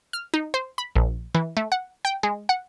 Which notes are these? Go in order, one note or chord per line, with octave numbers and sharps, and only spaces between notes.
F6
D#4
C5
B5
A#1
E3
A3
F#5
G5
G#3
F#5